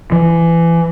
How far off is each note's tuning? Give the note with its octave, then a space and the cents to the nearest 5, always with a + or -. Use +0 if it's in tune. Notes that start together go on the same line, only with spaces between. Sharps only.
E3 +25